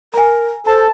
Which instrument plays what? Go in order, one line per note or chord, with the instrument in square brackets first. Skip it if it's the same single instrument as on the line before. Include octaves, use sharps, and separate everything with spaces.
[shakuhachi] A#4 [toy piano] G#5 A#5
[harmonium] A4 [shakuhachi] C5 [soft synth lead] A5